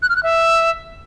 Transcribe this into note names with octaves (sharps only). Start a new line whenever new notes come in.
F#6
F6
F#6
E5